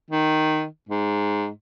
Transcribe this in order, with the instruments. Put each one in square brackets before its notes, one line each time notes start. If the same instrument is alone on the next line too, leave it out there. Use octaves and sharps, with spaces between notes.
[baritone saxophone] D#3
G#2